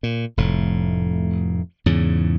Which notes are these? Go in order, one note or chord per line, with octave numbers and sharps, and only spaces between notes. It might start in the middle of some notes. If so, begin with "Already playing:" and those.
A#2
F1 A2
E2 G#2 C#3